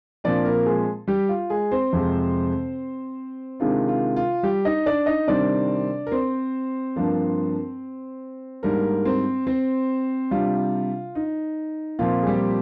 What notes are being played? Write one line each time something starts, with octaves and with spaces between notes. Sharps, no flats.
A#2 F3 C4 D4 D5
A#3 A#4
G#3 G#4
G3 G4
F4
G#3 G#4
C4 C5
F2 C3 F3 G#3
C3 D#3 G#3 D4 F4
F4
F4
G3 G4
D#4 D#5
D4 D5
D#4 D#5
C3 D#3 G3 C4 D4 D5
A#4
C4 C5
G2 F3 A#3 D4
G#2 G3 A#3 D4 A#4
C4 C5
C4 C5
C3 G3 D4 F4
D#4
A#2 F3 C4 F4
G#4
G3 G4